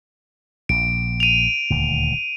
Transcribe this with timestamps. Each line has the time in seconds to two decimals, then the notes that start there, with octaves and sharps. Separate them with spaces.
0.69 A#1 D7
1.20 D#7 F7
1.70 D#1 D2